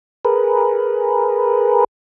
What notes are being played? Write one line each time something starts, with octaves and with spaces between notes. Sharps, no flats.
G#4 A#4 B4